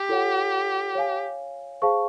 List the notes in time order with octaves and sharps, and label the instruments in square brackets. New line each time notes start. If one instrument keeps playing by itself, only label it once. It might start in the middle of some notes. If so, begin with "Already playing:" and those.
Already playing: [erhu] G4
[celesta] F4 A4 C#5 F#5
C#5 F5 G#5
G#4 C5 F5 A5 C#6